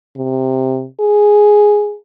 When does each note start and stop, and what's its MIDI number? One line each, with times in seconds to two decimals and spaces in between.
0.17 0.85 48
1.00 1.95 68